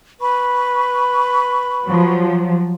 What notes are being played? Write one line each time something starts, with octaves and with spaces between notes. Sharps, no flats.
B4 B5 C#6
F3 F#3